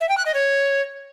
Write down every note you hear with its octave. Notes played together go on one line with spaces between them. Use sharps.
E5
G5
F#6
D#5
C#5